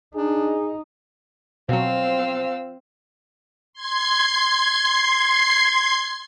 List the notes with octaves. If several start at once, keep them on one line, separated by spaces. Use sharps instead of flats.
D4 D#4 G#4
B2 F3 F#3 C4 F5 E6
C6 G#6 C7